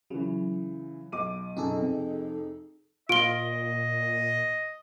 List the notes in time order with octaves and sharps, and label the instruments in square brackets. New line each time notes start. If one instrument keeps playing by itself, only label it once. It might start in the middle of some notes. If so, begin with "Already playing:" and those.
[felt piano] C#3 E3 [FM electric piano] F#3
[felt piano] B1 D6 D#7
[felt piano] F#2 B2 [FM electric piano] D#4 G#4 A4
[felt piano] F2 C3
[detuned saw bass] A#2 [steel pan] F4 [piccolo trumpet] D#5 [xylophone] D7 G7